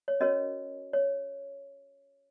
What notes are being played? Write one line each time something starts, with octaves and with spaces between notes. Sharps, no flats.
C#5
C#4 F#4 A#4 C#5 D#5
C#5